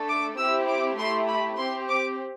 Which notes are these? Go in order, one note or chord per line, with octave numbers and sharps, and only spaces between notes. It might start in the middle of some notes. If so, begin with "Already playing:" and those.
Already playing: A3 D4 A4
D6
C4 E4 G4 E6
D6
A3 E4 G4 C6
B5
C4 G4 C6
D6